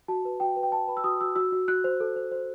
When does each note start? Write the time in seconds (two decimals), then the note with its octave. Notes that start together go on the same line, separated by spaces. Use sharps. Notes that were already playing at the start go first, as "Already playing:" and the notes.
0.08 F#4 A5
0.25 B4
0.40 F#4 G5
0.56 B4
0.63 G5
0.72 B4 A5
0.88 B4 B5
0.97 E6
1.04 F#4 D#6
1.21 F#4 E6
1.36 F#4 E6
1.52 F#4
1.68 F#4 F#6
1.84 C5
2.00 A4
2.16 C5
2.32 C5